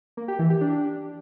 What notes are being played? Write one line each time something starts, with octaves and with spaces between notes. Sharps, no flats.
A#3
G4
E3
G4
D4